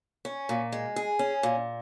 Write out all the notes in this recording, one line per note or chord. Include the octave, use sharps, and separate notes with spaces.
C#4
A#2
G#3
G#4
C#4
A#2